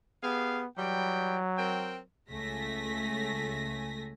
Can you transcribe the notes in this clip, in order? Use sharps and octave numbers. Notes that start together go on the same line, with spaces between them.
B3 G4 G#4 F5
E3 F#3 G3 G5
C4 A#4 G5
C#2 A3 G#5 A#6 B6